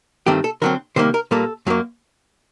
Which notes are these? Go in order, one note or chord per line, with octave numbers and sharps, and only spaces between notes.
G2 D#3 A3 C4 G4
A4
D3 F#3 C4 A#4
C3 D#3 G3 A#3 C5
A#4
A#2 G3 A#3 A4
F#2 F#3 A#3